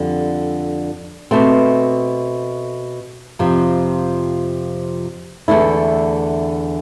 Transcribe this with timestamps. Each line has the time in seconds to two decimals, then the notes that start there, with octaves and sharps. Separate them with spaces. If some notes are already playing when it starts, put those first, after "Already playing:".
Already playing: F2 D3 G3
1.31 B2 A3 C4
3.39 F2 C3 F3
5.48 E2 D3 A3 E4